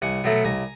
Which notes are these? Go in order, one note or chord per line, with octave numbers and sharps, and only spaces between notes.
C2 F#5 G#5
B2 F#3 A3
C2 G#5 A#5